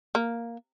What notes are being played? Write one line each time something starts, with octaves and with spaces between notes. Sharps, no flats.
A#3